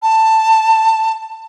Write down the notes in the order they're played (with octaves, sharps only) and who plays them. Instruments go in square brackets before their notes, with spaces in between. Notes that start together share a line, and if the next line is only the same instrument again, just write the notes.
[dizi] A5